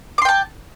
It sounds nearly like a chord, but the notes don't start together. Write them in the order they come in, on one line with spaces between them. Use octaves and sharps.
D6 C6 G5 A5